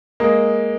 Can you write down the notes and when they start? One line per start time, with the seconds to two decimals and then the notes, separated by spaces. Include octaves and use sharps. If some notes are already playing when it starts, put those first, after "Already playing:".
0.20 G#3 A#3